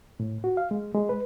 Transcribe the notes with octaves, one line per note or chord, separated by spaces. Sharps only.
A2
F#4
F5
G#3
G#3
B4